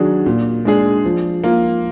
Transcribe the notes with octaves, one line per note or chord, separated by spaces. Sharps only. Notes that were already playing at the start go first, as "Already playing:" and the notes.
Already playing: D#3 F#3 D4 G#4
A#2
G#3 D4 G#4
F3
A#3 F4